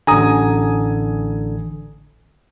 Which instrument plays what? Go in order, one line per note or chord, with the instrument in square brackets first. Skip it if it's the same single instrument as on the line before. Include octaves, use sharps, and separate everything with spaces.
[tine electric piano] A1 D3 [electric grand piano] G#5 A#5 D#6